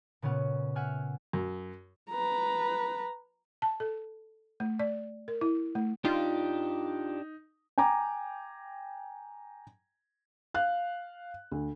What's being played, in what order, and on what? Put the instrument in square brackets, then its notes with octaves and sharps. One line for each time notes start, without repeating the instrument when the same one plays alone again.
[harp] A#2 C#3 B3 C#4 F#5
E5 F#5 G#5 F6
[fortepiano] F#2
[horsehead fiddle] B4 A#5
[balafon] A5
A4
A3
D5
A#4
E4
A3
[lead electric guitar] D4 G4 [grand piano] D#4 [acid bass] F4
[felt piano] G5 G#5 A#5 D6
F5 F#6
D2